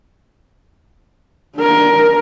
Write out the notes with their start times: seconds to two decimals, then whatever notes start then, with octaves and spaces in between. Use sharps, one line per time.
1.56 D4 A#4